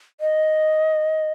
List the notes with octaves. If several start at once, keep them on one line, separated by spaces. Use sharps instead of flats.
D#5